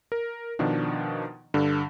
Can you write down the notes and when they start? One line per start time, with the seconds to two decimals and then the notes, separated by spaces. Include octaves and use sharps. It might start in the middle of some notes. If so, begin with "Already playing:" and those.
0.12 A#4
0.59 B2 D#3 F3 D4
1.54 G2 D3